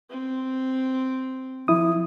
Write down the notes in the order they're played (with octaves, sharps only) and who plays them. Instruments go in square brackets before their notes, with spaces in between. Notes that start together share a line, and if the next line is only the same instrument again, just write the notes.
[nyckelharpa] C4
[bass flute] F3 [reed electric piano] E4 D#6